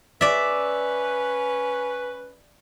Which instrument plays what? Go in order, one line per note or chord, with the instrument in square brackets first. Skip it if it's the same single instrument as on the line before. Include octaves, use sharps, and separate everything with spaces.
[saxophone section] C#4 B4 [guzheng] D5 E5